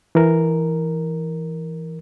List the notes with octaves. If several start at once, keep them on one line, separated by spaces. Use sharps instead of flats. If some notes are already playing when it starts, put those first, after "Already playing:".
E3 A#4